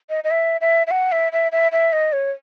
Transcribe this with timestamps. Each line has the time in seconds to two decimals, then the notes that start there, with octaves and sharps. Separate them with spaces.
0.10 D#5
0.24 D#5
0.31 E5
0.61 E5
0.87 E5
0.91 F#5
1.12 E5
1.32 E5
1.52 E5
1.72 E5
1.93 D#5
2.13 C#5